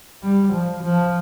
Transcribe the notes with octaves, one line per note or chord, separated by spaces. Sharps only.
G3
F3
F3